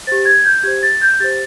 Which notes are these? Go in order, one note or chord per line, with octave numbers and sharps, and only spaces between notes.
G4 C5 A6
G#6
G6
G4 C5 G#6
A6
G6
G4 C5 A6